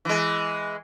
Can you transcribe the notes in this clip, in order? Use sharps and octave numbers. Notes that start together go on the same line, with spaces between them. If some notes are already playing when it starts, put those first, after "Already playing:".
E3 G#3